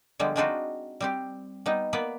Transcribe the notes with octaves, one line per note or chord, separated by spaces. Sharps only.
D3 F3 G3 G#3 B3
G#3 C4 D4 D#4 F4 F#4
G3 C4 G4
G3 B3 D#4
A#3 B3 B4 D5